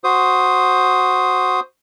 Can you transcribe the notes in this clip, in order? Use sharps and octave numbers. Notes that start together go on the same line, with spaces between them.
F#4 C5 D#6